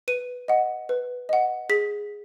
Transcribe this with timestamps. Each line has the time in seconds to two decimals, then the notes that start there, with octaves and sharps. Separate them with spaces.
0.08 B4 D#7
0.48 D#5 F#5
0.89 B4
1.29 D#5 F#5
1.69 G#4 B6